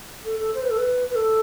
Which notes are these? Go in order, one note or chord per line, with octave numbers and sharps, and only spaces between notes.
A4
A4
C5
B4
A4
B4
B4
A4